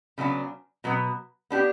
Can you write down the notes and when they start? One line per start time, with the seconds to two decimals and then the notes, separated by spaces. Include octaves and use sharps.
0.18 C#3 F#3 B3 D4
0.84 B2 F#3 B3
1.50 B3 D4 G4